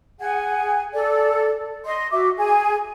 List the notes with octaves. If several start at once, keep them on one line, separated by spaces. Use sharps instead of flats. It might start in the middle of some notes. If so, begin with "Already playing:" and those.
G#4 F#5 G#5
A4 D5
D#5 C6
F#4 E5 D6
G#4 G#5